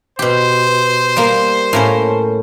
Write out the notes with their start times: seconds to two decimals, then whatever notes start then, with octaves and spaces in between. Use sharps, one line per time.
0.19 B2 G4 C5
1.17 G3 A#3
1.73 A2 A#3 C#4